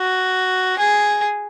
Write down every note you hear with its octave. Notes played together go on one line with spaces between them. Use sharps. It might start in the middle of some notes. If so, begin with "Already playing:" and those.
Already playing: F#4
G#4